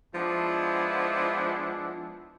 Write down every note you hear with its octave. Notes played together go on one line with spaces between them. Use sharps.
F3 G#3 B3 D4 E4